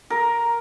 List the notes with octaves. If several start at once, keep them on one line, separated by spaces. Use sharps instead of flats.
A#4